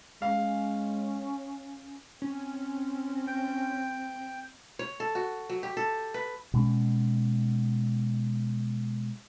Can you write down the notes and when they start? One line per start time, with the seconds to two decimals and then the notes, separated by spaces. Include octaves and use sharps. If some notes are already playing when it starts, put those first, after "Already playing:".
0.22 G#3 C#4 F5
2.22 C4 C#4
3.27 G5
4.79 C#5
5.00 A4
5.15 F#4
5.50 F#3
5.63 G4
5.77 A4
6.14 B4
6.54 B2 G#3 C#4